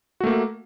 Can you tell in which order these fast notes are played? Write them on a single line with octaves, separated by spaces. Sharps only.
F#4 A3 A#3